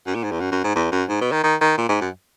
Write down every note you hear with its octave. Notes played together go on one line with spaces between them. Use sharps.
F#2
A#2
G#2
E2
F#2
F#2
G#2
E2
F#2
G#2
B2
D#3
D#3
D#3
A#2
G#2
F#2